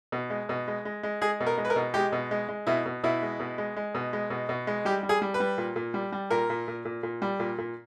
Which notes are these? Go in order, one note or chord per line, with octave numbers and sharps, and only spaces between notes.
B2
G#3
B2
G#3
G#3
G#3
G#3 G#4
B2
A#4
G#3
B4
A#4
B2
G#3 G4
B2
G#3
G#3
B2 E4
B2
B2 E4
G#3
B2
G#3
G#3
B2
G#3
B2
B2
G#3
G3 G4
G3
G#4
G3
B4
G3
A#2
A#2
G3
G3
A#2 A#4
A#2
A#2
A#2
A#2
G3
A#2
A#2